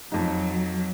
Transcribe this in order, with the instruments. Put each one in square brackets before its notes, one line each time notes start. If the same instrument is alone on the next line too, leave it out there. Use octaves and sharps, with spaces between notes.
[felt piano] F2 D#4 [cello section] F#3